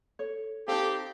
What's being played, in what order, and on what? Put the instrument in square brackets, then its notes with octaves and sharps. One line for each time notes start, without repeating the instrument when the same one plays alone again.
[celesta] A4 [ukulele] C#5
[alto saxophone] C4 [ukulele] D#4 A4 [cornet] G4 [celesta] F5 A5